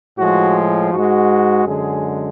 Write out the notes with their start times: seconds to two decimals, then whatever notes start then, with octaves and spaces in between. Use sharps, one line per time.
0.18 A2 F3 G#3 F#4
0.93 G#2 G#3 F#4
1.66 F#2 D3 G#3 G#4